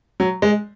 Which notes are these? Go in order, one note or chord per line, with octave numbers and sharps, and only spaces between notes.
F#3
G#3